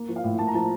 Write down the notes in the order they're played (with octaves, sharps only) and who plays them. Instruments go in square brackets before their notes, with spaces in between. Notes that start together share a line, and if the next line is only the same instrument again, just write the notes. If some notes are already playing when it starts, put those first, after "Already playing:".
Already playing: [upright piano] A#3
F3
F5
A2
A#3 A5
A#5
F3 A5